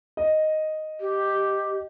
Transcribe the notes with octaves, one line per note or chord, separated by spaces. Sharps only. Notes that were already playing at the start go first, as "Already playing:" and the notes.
D#5
G4